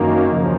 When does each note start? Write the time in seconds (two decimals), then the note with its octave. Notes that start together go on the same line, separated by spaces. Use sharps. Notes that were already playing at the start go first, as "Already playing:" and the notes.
Already playing: F#2 D#3 A#3
0.26 D#2 C#3 F3